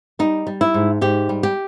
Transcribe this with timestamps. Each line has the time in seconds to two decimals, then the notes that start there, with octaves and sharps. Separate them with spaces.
0.19 G3 D#4
0.47 G3
0.61 E4
0.74 G#2
1.01 G#2 G4
1.29 G3
1.43 G4